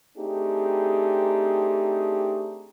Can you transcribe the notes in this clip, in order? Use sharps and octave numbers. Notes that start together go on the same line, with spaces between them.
A3 C4 D4 D#4 G4 G#4